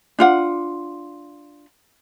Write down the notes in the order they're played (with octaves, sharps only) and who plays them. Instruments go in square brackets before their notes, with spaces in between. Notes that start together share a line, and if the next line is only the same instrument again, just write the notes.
[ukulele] D4 F4 F#5